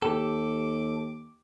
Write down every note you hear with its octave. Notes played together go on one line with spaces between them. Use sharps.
D#2 G4 A4 D6